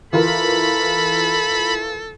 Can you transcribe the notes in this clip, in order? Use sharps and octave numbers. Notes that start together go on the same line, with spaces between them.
E3 F4 A4 A#4 B5